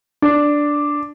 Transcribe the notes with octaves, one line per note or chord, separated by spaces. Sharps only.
D4